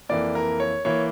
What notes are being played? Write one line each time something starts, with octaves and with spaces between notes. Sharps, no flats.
F2 E3 A#3 D5
A#4
C#5
E3 A#3 C#5